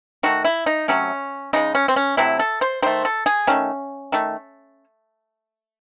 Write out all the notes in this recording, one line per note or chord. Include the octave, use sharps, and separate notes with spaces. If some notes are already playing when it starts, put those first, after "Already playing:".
D#3 A3 F#4
E4
D#4
C3 F#3 A3 C#4
C#3 G#3 D#4
C#4
C4
C#4
C3 F#3 A3 E4
A4
C5
D#3 A3 C5
A4
G#4
D#3 A3 C#4
D#3 A3